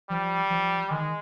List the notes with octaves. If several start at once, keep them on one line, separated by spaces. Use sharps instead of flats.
F3 G3
F3
D#3 G#3